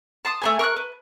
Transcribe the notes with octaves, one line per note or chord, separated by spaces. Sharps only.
A5 C6 D#6
A3 B3 G#5
A#4 C#6 F6 F#6
B4